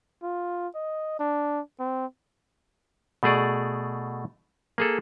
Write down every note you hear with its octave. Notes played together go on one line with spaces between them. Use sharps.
F4
D#5
D4
C4
B2 A3 G#4 D5
A#3 G#4 A4